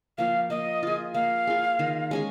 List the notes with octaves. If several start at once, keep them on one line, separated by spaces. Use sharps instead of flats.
F3 A#3 F5
A#3 D#5
F4 G#4
A#3 F5
F4 G#4
D#3
G#3 C#4 G#4